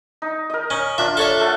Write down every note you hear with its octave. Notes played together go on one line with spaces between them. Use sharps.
D#4
A#4 D#5
C#4
D4 F4 E5
A4 C#5 E5
A3 F#5